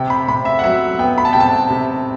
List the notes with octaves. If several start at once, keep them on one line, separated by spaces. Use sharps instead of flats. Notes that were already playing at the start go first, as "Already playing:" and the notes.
Already playing: C3 G5
B5
C3 B5
E5
F#5
F#3 E5
B3 G5
B5
A5
C3 G5
A5
C3